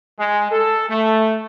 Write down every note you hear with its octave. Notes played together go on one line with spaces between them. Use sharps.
G#3
A4
A3